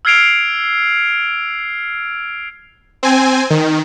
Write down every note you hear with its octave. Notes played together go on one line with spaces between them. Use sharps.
E6 F6 G#6 C7 D7 F7
C4 G#5
D#3